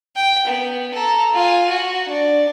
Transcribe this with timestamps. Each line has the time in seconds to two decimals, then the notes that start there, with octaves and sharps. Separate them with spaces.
0.16 G5
0.47 B3
0.94 A4 A#5
1.33 F4 G#5
1.69 F#4
2.08 D4 D5